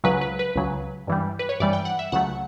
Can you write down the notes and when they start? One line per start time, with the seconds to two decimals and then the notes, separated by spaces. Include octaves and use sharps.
0.04 C#2 C#3 F#3 B4
0.21 B4
0.39 B4
0.55 C#2 C#3 F#3
1.07 G2 E3 G3
1.39 B4
1.49 C#5
1.60 G2 E3 G3 D5
1.73 G5
1.85 F#5
1.99 E5
2.12 C#2 C#3 F#3 A3 F#5